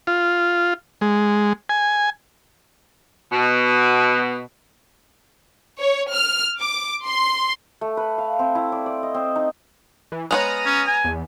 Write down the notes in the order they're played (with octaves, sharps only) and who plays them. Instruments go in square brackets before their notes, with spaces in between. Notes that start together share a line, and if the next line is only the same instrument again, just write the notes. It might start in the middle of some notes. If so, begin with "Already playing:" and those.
[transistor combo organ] F4
G#3
G#5
[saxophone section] B2
[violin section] C#5
F6
D6
C6
[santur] A3
B4
F5
C4
E4
D5
D5
D#5
C4
D#4
[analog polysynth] E3
[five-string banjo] G#3 B3 C#5 [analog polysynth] A#5 D#6 F6
[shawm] C#4
G#5
[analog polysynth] E2